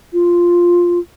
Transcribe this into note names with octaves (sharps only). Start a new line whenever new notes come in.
F4